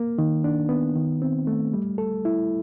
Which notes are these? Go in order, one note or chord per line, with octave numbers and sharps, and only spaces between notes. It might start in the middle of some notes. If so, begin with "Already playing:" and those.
Already playing: A#3
D#3
D4
B3
D#3
C4
A3
G3
A4
E4